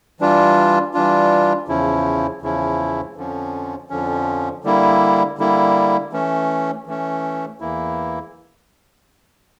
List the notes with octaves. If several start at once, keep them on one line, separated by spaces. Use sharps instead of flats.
E3 G3 D4 F4
E3 G3 D4 F4
E2 C#3 F3 C#4 E4
E2 C#3 F3 C#4 E4
F2 D3 F3 C#4
F2 D3 F3 C#4
D3 G3 A#3 E4
D3 G3 A#3 E4
E3 A3 C#4
E3 A3 C#4
E2 E3 A#3 E4